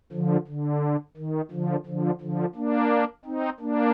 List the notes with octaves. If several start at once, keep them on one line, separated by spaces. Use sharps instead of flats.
D3 F3
D3
D#3
D3 F3
D3 F3
D3 F3
A#3 D4
C4 D#4
A#3 D4